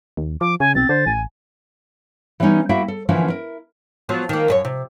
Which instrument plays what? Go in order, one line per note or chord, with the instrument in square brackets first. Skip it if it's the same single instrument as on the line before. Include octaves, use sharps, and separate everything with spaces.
[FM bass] D#2
[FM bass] F3 [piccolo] D6
[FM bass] C#3 [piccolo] G#5
[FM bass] B1 [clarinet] C4 [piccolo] A6
[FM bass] D3 [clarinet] C5
[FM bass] A1 [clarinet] G#5
[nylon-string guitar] E3 G3 B3 C#4 D#4
A#3 E4 F#4 E5 G5
A4
D3 E3 F3 A#3 C#4 E4
E4 A#4
[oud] F3 F#3 B3
D#3 A#3
F#2 B4 C#5
C3